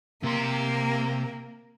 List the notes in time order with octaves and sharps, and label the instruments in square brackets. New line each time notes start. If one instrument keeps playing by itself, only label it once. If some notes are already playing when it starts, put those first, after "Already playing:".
[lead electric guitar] C3 C6 [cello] A#3